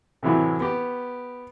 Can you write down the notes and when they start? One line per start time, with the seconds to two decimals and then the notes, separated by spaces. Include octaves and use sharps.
0.23 A2 C3 E3 F#3 E4 G4
0.60 B3 G4